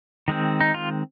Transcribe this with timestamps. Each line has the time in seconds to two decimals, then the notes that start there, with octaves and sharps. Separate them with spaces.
0.28 D#3 G#3 C4
0.61 D#4
0.74 F4